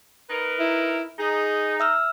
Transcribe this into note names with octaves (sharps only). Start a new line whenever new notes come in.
D#4 A#4 B4
E4
D#4 G#4
E5 E6 F6